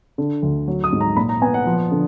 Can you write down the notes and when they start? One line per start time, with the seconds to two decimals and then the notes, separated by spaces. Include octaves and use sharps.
0.18 D3
0.42 D2
0.68 F#3
0.84 D#6
0.92 G#2
1.01 A#5
1.16 A#2 B5
1.29 A#5
1.42 B3 G#5
1.54 F#5
1.67 F3
1.91 D3